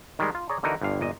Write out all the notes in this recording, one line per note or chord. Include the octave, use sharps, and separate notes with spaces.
D#3 G3 G#3
F4
G#4 C#5 D5 A#5
D3 E3 D#4 F#4 A#4 D#5
G1 G2 D3 F5
G1 A#2 D#5